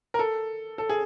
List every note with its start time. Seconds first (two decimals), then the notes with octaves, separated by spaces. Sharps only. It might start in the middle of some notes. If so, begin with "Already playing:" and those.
0.14 A#4
0.19 A4
0.78 A4
0.89 G#4